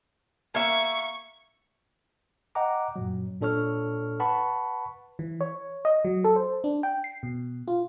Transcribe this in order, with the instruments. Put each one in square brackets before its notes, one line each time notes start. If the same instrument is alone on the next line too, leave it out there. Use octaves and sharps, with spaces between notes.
[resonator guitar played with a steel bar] A#3 E5 [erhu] C#6
[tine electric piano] D#5 F#5 G5 A#5 D6
F#2 A#2 F#3
A#2 D4 A4 C#5 C#6 F6
B4 F#5 A5 B5 C#6
[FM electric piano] E3
C#5
D#5
F#3
A4
C5
D4
G5
C7
B2
F4